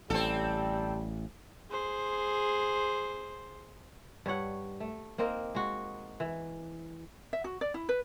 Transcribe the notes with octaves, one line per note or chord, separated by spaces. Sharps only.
A1 G3 C4 A4
G#4 C5
G2 G3 C#5 F#5
A3
A#3 C4 D#4 A#4
G#3 F#4
E3
E5
F#4
D5
E4
B4